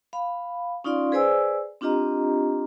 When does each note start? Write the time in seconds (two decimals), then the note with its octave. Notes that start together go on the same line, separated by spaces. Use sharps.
0.13 F5 B5
0.84 C#4 D#4 F4 D5 F5 C6
1.12 G#4 B4 C5 D5 G#5 E6
1.81 C4 D4 F4 G4 D#5 A#5